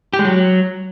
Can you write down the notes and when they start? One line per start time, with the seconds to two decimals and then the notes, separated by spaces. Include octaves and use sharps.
0.13 G4
0.19 G#3
0.25 F#3